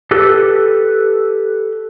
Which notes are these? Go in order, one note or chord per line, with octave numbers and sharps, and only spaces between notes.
G4 A4 B4